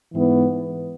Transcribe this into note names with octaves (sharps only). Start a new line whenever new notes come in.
G#2 E3 B3